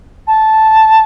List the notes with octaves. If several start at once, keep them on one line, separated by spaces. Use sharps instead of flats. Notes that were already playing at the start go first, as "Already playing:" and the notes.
A5